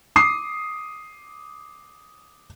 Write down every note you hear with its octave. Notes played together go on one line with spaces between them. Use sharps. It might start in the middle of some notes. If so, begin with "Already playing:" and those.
D6 D#6 C7